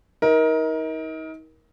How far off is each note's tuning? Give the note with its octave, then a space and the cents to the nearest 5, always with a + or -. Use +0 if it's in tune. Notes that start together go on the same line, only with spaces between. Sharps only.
D#4 +35 A#4 +20